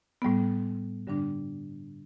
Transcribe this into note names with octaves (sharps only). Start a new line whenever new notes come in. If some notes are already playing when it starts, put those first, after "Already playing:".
A2 G3 B3
G2 D3 G3 D4